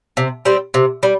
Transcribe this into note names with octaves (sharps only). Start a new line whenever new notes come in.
C3
G3 C4
C3
G3